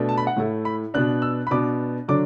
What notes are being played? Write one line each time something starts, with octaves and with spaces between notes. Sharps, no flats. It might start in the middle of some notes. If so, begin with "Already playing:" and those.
Already playing: B2 A3 D4
A5
B5
F#5
A2 A3 E4
B5
B2 B3 D4 F#6
E6
B5
B2 B3 D4 D6
D3 F#3 D4 D6